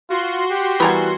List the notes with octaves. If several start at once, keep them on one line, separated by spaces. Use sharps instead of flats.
F4 F#4 C6
G4
E3 G3 B3 A#4 G#5